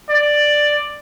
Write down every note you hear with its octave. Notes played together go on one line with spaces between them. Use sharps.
D5